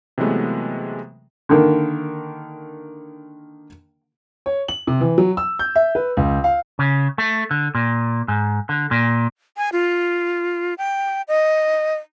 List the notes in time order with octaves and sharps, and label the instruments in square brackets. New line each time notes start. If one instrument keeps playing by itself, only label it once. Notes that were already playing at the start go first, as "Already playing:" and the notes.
[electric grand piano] C3 E3 F#3 G#3 A3 B3
[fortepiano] D3 D#3 A#3
[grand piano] C#5
F#7
C3
E3
F#3
E6
G6
E5
B4
C#2
F5
[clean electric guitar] C#3
A3
D3
A#2
G#2
D3
A#2
[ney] G#5
F4
G5
D#5